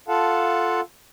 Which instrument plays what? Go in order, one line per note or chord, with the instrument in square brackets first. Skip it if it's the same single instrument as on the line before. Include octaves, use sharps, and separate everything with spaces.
[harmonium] F4 A4 F5 F#5 A5